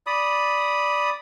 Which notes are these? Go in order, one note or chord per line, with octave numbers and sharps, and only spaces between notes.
D5 B5 D#6